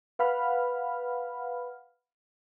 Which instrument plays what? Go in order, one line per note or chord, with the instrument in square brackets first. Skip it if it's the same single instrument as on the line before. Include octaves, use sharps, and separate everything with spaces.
[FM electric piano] B4 F5 F#5 B5 F6